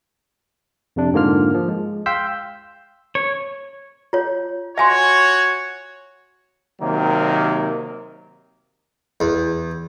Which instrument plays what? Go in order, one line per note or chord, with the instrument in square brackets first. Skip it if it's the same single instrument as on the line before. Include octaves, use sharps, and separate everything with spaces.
[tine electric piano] F2 C3 D4
G#2 D3 A#3 F4 F6
F3
G#3
F5 G5 C6 E6 G6 B6
[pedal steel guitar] C#5
[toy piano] F4 C#5
[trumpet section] F#4 C#5 [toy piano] E5 G#5 C6
[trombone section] C3 D#3 F#3 A#3
[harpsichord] E2